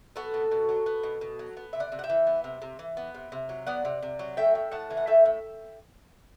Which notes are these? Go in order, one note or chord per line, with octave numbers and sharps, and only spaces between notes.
B3 F#4 A4
B2
B2
F#3
B3
B2
B2
F#3
B3
C3 E5
D5 F#5
C3
F#5
E5 G5
E3
B3
C3
C3
E3
B3
C3
C3
F#3
B3 D5 F#5
C3
C3
F#3
A3 E5 G5
A2
A2 F#5 A5
E3
F#5
A3 E5 G5
A2